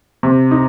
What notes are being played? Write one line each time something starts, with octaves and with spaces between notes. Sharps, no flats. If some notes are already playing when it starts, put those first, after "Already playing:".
C3
D#4